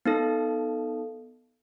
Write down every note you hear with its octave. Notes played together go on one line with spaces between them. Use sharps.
B3 D#4 A4